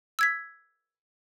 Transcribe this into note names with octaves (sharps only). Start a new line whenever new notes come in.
E6 G#6 B6